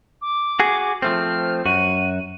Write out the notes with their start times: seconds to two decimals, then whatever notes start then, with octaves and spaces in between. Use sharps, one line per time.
0.22 D6
0.60 F#4 G#4
1.02 F3 A3 C4 F6
1.66 F#2 F#4 D#7